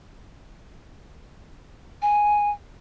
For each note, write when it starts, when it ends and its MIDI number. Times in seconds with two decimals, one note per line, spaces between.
2.02 2.51 80